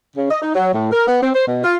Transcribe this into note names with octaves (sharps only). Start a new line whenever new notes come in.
C#3
D#5
D#4
F#3
A2
A#4
B3
C4
C5
B2
F4